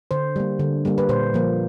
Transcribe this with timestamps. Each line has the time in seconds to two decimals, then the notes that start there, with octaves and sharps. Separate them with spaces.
0.11 D3 C5
0.36 G3 A#3
0.59 D3
0.85 G3 A#3
0.98 B4
1.09 A#2 C5
1.34 F3 A#3